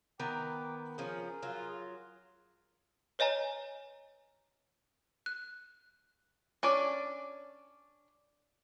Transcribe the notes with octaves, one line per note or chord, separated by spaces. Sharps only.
D#3 B3 G5 A#5 D6
F3 C#4 G#4 A#4
F#3 F4
B4 C#5 D#5 G#5 A#5
F#6
C#4 D4 D5